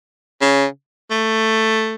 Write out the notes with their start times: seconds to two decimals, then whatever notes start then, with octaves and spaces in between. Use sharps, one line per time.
0.41 C#3
1.11 A3